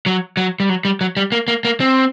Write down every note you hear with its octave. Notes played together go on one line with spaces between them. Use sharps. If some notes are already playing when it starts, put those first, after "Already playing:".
F#3
F#3
G3
F#3
G3
F#3
G3
A#3
A#3
A#3
C4